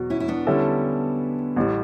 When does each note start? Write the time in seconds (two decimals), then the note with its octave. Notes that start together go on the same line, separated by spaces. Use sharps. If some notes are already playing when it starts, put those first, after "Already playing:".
Already playing: E2 B2 F#3
0.10 C#4 E4
0.20 E4
0.28 B3 D4
0.47 D3 G3 C#4 E4 A4
1.56 A1 A2 G3